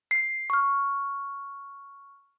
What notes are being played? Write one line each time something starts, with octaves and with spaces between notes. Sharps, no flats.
C7
C#6 F6